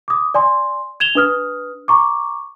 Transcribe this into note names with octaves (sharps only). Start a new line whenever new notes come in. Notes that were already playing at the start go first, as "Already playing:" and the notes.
D6 D#6
D5 G#5 C6
G#6 E7 F7 G7
D4 B4 D#6 F6
A#5 C#6 D6